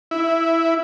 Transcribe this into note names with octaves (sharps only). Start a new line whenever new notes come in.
E4